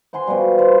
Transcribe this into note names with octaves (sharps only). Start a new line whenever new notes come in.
C5 F#5 G#5 C6
B2 F3 G3
C5 B5